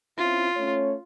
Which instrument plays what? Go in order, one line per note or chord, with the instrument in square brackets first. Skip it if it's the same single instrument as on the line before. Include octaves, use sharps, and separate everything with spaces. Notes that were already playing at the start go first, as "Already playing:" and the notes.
[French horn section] C4 C#4 E4 [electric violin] F4
[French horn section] A3 C#4 C#5